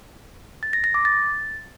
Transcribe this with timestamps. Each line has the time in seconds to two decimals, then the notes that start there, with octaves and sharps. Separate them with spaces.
0.63 A6
0.73 A#6
0.84 A#6
0.94 D6
1.05 A6